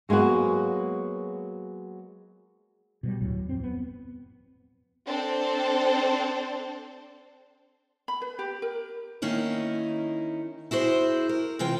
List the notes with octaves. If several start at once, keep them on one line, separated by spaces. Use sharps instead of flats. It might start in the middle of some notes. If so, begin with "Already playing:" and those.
F#3 G#3 A#3 B3 F#4
B2 F#3 G3
E1 D2 A2 F#3
D#1 F2 C4
B3
C4 D4 A4 C5
B5
B4
G4
A#4
D#3 A#3 C#4 D#4 E4
E4 F#4 G#4 C5
A#4
C3 E3 F4 G5